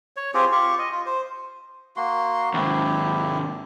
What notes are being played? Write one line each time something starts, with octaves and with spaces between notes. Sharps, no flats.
C#5
C4 F4 G4 G#4
F4 G4 C#6
D#5
F4
C5
A#3 F#4 C6
D#2 G#2 E4 G4